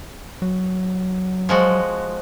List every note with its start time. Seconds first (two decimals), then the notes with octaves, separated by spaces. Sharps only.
0.42 F#3
1.49 F3 G#3 F#4